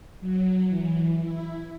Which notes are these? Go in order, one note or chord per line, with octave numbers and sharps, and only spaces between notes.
F#3
E3
E4